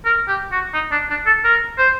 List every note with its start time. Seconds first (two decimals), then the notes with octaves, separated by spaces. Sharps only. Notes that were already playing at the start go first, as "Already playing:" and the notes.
0.05 A#4
0.28 G4
0.52 F#4
0.74 D#4
0.92 D4
1.10 D4
1.27 A4
1.44 A#4
1.78 C5